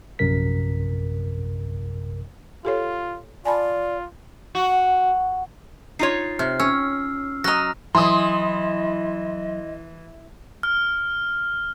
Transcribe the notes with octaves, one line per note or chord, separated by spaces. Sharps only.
A#1 F#2 C3 A#4 B6
F4 G4 A4 C#5
F4 D5 G#5 A5 B5
F#4
D#4 F4 C#5 C7
C3 F6
C#4 E6
F#3 D#5 A#5 F6 A#6
E3 F#3 D#5 C6 D#6
F6